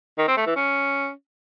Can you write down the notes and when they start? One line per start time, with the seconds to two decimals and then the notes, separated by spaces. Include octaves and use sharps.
0.18 D#3
0.28 C4
0.37 A3
0.47 E3
0.56 C#4